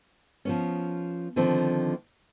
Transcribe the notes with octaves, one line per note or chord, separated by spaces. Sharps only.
F3 B3 C#4
D3 D#3 F3 C4